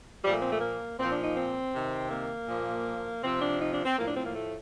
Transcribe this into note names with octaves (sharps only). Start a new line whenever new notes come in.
A#2 F3 G3
A3
C4
A3
A#3
A#2 F3 C4
D4
D#4
C4
C3 D#3
A#3
A#2 F3
C3 F3 C4
D4
D#4
D4
C4
A2 F3 A#3
D4
C4
A#3
A3